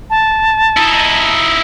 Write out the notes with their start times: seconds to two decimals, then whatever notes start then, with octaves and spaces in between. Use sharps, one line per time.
0.10 A5
0.77 D#4 E4